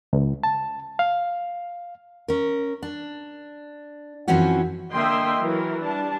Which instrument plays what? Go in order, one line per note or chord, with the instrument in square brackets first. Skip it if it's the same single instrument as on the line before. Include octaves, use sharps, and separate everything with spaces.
[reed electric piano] C#2
A5
F5
[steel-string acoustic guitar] C#4 A#4
D4
F#2 E3 F3 C4 C#4 F#4
[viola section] D3 A#3 D#5 E5 G5 C6
E3 F#3 A#4
G3 D4 A5